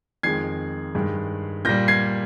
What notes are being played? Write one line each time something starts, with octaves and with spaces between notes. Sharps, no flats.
F2 D#3 G#3 G#6 C7
G2 D#3 G#3
A#2 G3 G6 A#6
G#6 C7